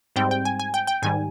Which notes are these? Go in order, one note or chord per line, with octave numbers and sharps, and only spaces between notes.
G#2 G3 C4 G5
G5
G#5
G#5
G5
G5
G#2 D#3 G3 G#5